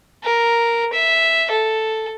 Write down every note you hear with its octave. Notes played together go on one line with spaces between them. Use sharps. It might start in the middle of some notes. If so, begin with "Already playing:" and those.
A#4
E5
A4